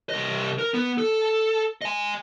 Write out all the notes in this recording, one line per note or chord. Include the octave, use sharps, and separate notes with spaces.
C2 D#5
A#4
B3
A4
D#5 G#5